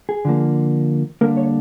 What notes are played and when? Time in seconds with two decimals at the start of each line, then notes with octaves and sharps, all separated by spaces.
0.09 G#4
0.25 D3 F3 A#3
1.21 D3 G3 A#3 A#4
1.37 C#5